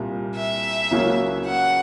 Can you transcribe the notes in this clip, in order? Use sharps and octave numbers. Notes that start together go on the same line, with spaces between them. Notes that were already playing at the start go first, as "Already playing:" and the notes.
Already playing: C2 A#2 G3
E5
C#2 C#3 F#3 A#3 C#4
F#5